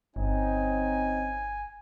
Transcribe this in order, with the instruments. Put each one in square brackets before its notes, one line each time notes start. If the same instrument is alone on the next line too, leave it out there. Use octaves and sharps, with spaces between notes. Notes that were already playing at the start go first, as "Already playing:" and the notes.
[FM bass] G1 [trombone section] C4 C#4 D#4 [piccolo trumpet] G#5